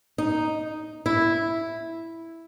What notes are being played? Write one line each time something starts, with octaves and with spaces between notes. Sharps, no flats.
D#4
E4